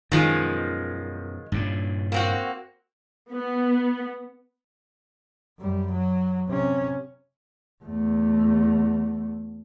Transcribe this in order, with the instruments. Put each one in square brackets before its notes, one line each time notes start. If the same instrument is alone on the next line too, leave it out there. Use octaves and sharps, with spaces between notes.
[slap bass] F#2 B2 [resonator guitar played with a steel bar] D#3 F3 G#3
[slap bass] G2 A#2 C#3
[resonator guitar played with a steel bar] A#3 C4 F#4
[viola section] B3
[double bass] F#2 G3
F#3
C3 C#4
E2 A3